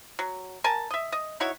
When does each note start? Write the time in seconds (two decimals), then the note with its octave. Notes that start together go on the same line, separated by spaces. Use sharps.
0.19 F#3
0.64 A#4 G#5 A5
0.91 D#5 E5
1.12 D#5
1.40 D#4 E4 F#4 C#5